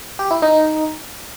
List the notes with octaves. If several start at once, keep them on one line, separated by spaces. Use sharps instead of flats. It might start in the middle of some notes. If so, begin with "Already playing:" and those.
G4
E4
D#4